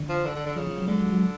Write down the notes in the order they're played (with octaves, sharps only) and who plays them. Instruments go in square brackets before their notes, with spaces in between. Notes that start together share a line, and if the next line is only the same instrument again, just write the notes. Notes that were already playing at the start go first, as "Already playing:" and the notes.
Already playing: [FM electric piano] D3
[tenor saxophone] F3
D3
D3
D3
[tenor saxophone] C#3 [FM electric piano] F3
[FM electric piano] F3
F#3
[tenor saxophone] D3 [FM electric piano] G#3
[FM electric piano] F#3
F#3